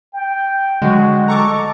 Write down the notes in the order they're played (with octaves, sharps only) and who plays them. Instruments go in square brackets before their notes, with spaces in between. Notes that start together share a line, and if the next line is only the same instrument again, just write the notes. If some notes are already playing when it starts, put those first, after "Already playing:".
[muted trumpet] G5
[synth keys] D3 F#3 [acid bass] G#3 [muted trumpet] F#4
[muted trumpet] A4 [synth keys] A#5 C#6 D6